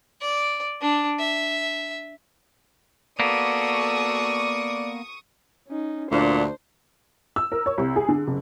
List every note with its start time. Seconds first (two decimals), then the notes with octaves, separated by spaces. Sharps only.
0.21 D5
0.81 D4
1.19 E5
3.20 A#3 B3 F#4 A4 D5 C#6 D#6
5.68 C#4 D#4
6.11 D2 A#2 D4 C5
7.36 E6
7.52 A#4
7.66 C#5
7.78 C2
7.96 G#4
8.08 D3
8.27 F#1